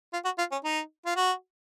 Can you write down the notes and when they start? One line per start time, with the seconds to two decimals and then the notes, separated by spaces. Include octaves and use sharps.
0.13 F4
0.25 F#4
0.38 F4
0.52 C#4
0.64 D#4
1.06 F4
1.16 F#4